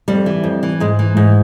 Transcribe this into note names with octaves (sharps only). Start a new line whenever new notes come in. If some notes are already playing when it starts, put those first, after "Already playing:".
F2 G3
E3
F2
E3
G#2 G#3
E3
G#2